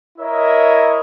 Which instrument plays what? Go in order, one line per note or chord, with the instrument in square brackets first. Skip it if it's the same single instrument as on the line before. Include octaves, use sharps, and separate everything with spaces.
[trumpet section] E4 A#4 C#5 D#5 E5